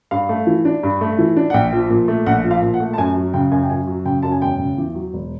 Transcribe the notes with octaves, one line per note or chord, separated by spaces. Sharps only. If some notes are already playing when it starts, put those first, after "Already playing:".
G2 F5
A3
E3
D4
G2
A3
E3
D4
F#5
A#1 G5
F3
A#2
A3
A#1 F#5
F3
F5
A#2
F#5
A3
A5
F#2 G#5
F#3
C#3 G5
F#2 G#5
G5
F#2 G#5
F#3
C#3 G5
F#2 A5
G#5
E1 G5
C#3
E2
F#3
E1